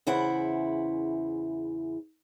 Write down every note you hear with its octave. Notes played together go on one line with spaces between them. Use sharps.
E2 C#3 E4 C5 F#5